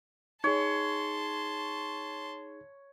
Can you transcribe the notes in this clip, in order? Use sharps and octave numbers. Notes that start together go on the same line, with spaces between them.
D#4 G#4 C#5 A5 C6